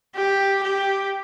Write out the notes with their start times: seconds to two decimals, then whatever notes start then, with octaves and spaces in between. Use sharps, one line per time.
0.15 G4
0.63 G4